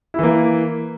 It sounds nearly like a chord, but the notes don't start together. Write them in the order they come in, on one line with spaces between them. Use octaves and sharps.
E4 E3 A#3